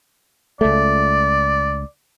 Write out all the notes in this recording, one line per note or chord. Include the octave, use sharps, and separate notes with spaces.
C#2 A3 D5